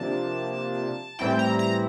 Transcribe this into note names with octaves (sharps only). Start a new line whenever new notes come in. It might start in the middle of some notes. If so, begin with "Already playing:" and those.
Already playing: C3 F3 A#3 D4 A5
A2 E3 G3 C4 E4 G5
A#5
A#5